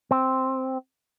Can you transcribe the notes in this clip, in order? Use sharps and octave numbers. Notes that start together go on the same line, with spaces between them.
C4